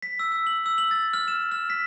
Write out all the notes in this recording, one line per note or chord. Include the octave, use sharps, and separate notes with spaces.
B6
E6
E6
F#7
E6
F#7
A6
F6
E7
F6
B6